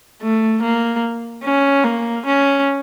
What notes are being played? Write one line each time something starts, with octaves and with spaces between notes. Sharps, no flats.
A3
A#3
C#4
A#3
C#4